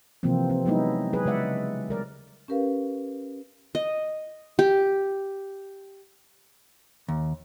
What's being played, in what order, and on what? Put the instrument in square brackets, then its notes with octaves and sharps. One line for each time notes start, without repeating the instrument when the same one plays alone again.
[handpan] C3 E3 F3 A#3 C4
C4
F#3 G#3 B3 D#4 E4
F#3 G#4 B4
C#3 G#3 D5 E5 F#5
G3 A#4 D5
[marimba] C#4 G4 A#4 B4 F5
[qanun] D#5
G4
[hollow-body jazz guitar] D#2